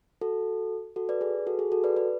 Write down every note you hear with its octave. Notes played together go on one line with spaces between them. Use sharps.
F#4 A4
F#4 A4
B4 D5
G#4 B4
F#4 A4
G#4
F#4 A4
B4 D5
B4 D5